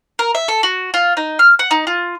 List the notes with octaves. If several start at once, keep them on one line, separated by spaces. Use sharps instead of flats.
A#4
E5
A4
F#4
F4
D#4
F6
F#5
D#4
F4